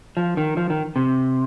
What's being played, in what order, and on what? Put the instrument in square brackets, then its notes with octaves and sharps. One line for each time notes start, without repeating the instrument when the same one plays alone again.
[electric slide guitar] F3
D#3
F3
D#3
C3